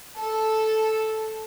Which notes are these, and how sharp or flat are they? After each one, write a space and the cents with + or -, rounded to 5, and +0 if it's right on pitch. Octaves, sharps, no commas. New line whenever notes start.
A4 -5